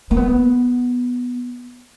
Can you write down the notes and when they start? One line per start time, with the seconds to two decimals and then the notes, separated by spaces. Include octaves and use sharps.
0.11 A#3
0.17 B3